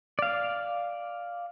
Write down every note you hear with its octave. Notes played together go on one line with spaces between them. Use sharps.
D5 F5